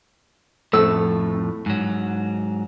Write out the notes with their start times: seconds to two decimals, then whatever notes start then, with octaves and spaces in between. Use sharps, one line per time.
0.73 F2 A2 A3 E6
1.66 G#2 F#3